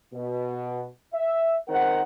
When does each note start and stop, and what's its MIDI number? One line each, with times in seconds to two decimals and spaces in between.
0.13 0.85 47
1.13 1.56 76
1.69 2.01 37
1.69 2.01 51
1.69 2.01 60
1.69 2.01 70
1.69 2.01 72
1.69 2.01 78